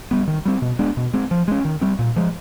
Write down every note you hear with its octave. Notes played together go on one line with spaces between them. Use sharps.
G3 B3
D#3
G3 C4
B2
G#3 B3 D4
B2
G#3 C4
F3
G#3 C#4
D#3
G3 C4
A#2
F3 G#3